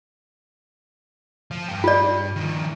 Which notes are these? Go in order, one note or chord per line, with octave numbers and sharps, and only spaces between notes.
F3
G2 G4
F4 D5
D#3 F3